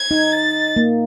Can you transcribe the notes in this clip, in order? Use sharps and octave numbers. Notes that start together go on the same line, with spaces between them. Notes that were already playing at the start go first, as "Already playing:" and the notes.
Already playing: G#6
D#4
A6
A#3